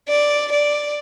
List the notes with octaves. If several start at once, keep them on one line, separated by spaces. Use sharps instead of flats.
D5
D5